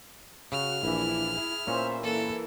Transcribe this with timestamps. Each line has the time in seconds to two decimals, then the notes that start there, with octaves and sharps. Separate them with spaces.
0.52 C#3 F#4 F6
0.83 A#1 E3 D4 E4
1.35 E4 G#4
1.67 A#2 B3 C#4 C5 E5 A#5
2.03 E3 A#3 E4 A4